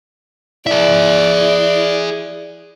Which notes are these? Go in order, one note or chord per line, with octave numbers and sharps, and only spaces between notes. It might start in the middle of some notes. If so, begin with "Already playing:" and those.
E4 G#4 D5 E5